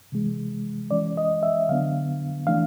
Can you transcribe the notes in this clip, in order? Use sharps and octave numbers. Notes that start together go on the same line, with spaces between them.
C3 E3 G#3
E3 G#3 C#4 D5
D#5
E5
D3 F#3 B3 D4 F5
E3 A3 D4 F5